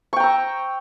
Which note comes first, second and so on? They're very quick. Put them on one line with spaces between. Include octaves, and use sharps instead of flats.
C#6 G5 A#5 E6